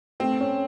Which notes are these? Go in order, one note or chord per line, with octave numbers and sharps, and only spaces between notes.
A3 C4
C#4